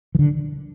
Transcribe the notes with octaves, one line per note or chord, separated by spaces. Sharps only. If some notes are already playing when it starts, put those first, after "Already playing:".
E3
D3